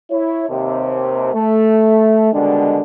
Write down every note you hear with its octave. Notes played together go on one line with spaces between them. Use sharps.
E4 C#5
D#2 C3
A3
B2 D3 D#3 G3 G#3 D4